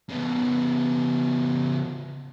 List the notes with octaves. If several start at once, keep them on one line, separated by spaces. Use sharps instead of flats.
C#3 B3